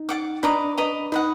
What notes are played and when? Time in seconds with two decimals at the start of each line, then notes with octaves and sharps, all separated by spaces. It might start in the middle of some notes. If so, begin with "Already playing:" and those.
Already playing: D#4
0.09 D5 F#5 D6
0.43 D4 B4 D#5 A#5 D6
0.77 B4 D#5 A#5 D6
1.12 D#4 B4 D#5 F#5